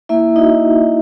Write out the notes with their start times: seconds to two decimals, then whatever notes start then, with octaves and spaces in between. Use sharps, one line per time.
0.09 A#3 E4 E5
0.36 D#4 F#4 D#5